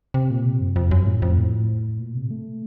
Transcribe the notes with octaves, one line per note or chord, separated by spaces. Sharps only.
C3
A#2
C3
F#2
F2
F#2
A2
F2
A2
A#2
C3
A3